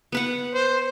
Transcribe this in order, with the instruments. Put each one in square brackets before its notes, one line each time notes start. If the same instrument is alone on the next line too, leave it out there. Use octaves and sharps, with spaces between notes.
[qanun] B3 B4 F#5
[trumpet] C5